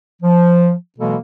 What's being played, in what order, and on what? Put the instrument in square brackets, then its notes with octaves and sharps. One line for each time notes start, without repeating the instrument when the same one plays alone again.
[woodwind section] F3
B2 E3 F#3 G#3 A#3 A4